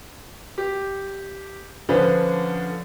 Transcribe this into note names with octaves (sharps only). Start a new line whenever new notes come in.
G4
D3 F3 C#4 D4 B4